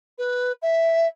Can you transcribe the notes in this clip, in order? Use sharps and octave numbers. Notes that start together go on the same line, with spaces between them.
B4
E5